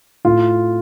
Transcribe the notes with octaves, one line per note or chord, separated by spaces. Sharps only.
A2 F4